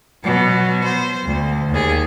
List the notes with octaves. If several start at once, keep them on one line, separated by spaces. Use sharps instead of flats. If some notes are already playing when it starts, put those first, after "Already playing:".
B2 F#3
C5
D2
D#2 G#4